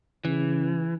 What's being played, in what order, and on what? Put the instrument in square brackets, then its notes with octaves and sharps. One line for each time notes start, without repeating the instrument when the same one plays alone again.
[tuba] C#3 [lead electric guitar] E3